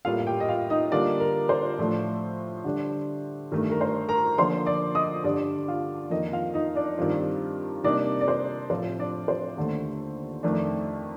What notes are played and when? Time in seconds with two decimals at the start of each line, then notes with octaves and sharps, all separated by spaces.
0.05 A2 G3 A#3 F4 F5
0.20 F5
0.26 G4 G5
0.40 D#5
0.48 F4 F5
0.70 D#4 D#5
0.91 D3 G3 A#3 D4 F4 D5
1.20 A#4
1.49 C5
1.78 A2 F3 A3 D4 F4
2.64 D3 G3 D4
3.52 G2 D#3 A3 A#4
3.71 A#4
3.81 C5
4.09 A#4 A#5
4.38 D3 F3 A#3 C5 C6
4.66 D5 D6
4.95 D#5 D#6
5.24 G2 D3 G3 D4 D5 D6
5.68 F4 F5
6.10 F2 D#3 A#3 D#4 D#5
6.32 F4 F5
6.54 D#4 D#5
6.75 D4 D5
6.98 G2 D#3 G3 C4 F4
7.84 C3 G3 A#3 D4 D#4 D5
8.21 D5
8.28 C5
8.70 A2 F3 C4 F4 C5
8.99 D4 D5
9.28 C5
9.57 D#2 D3 A3
10.43 F2 D#3 A3 D4